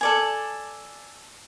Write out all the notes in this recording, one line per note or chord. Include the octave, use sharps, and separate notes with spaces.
A4 D5 G#5